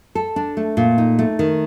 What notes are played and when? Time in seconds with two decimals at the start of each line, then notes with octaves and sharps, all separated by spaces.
0.15 A4
0.36 D4
0.57 A3
0.77 A#2
0.98 D#4
1.19 A3
1.39 D#3